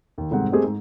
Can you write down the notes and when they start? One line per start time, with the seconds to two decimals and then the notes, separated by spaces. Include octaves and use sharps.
0.18 D#2
0.31 F1 G#2 G3 C4 C5 F#5
0.52 G#3 A3 C4 G4 G#4 A#4
0.64 G#2